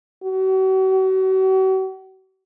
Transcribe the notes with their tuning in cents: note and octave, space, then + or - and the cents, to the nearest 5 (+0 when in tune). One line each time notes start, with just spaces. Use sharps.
F#4 +40